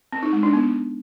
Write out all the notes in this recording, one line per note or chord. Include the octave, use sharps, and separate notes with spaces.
C4
D#4
G#3
D4
B3